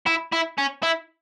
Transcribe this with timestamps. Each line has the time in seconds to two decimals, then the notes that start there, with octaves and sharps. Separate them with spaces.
0.06 E4
0.32 E4
0.58 C#4
0.83 E4